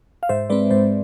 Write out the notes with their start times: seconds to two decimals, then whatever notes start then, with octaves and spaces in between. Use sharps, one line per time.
0.23 F5
0.29 G#2 C5 E5
0.50 G#3 C4 B4 D5
0.71 G#2 C5